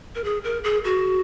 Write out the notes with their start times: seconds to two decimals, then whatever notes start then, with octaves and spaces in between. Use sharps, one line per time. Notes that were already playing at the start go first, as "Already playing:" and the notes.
0.15 A#4
0.24 G#4
0.44 A#4
0.64 G#4
0.84 F#4